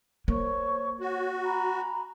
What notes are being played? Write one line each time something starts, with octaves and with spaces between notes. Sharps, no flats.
A#3 C5 C#5 C#6
F#4 C#5
G#5 A#5 B5